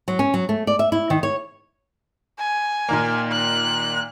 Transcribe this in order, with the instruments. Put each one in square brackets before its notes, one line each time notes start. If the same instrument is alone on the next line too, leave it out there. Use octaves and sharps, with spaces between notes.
[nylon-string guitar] F#3
C#4
F#3
A3
D5
E5
E4
D#3
C#5
[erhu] G#5
[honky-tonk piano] A#2 D#3 A#3
[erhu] F#6